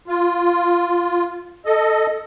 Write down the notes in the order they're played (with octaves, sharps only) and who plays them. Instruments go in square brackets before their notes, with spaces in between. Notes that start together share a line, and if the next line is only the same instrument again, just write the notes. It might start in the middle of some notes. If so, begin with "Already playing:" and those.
[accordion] F4
A4 D#5